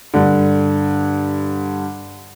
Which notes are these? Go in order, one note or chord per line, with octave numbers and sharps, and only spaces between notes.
G2 D3